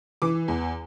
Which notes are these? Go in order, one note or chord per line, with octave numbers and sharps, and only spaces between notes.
E3 D6
E2